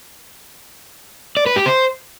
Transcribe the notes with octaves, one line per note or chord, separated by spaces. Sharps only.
D5
B4
G4
C5